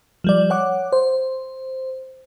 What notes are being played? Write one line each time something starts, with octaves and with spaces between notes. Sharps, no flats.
F3 G3 D5
C#5 F#5 D6
C5